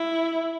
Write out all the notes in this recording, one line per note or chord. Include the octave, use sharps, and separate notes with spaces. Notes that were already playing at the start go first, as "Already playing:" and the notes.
Already playing: E4